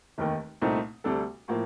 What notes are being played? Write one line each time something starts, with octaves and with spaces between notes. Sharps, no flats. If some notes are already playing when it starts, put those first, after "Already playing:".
F1 D#2 D#3
C2 A#2 A3 C4 D#4
D2 C3 G3 D4 A4
A2 F3 A#3